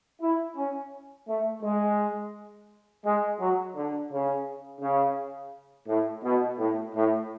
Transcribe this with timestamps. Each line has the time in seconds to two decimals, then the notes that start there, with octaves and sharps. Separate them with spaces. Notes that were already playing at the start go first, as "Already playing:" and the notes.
0.21 E4
0.56 C#4
1.28 A3
1.62 G#3
3.05 G#3
3.39 F#3
3.75 D3
4.11 C#3
4.80 C#3
5.87 A2
6.23 B2
6.58 A2
6.94 A2